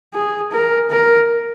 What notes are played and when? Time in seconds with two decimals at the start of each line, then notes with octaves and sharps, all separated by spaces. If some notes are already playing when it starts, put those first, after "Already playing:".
0.14 G#4
0.52 A#4
0.91 A#4